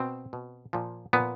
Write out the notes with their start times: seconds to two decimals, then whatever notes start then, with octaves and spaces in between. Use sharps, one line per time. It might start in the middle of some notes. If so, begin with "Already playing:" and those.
Already playing: B2 C4
0.33 B2
0.73 A#2 F3
1.13 A#2 F3 B3